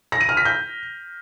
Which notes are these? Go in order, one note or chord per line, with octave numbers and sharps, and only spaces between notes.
A#6
D#7
F6
B6
G6